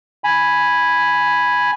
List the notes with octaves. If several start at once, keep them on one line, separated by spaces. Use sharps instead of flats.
G#5 B5